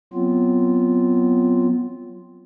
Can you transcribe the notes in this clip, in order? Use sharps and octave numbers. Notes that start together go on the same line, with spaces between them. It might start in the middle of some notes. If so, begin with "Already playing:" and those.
F#3 B3 C4 F4